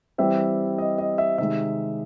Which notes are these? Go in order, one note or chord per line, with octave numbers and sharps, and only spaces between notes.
E3 G3 C4 E5
D#5
D#5
E5
C3 D#3 G#3 E5